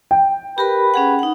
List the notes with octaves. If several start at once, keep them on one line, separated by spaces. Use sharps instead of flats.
G5
G4 A#4 B4 B5
C#4 G#4 F#5
D#4 F#5